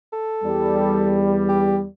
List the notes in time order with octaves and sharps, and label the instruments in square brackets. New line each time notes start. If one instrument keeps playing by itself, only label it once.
[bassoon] A4
[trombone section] E2 G3
[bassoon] G4